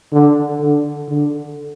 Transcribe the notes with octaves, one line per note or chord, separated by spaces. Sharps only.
D3
D3
D3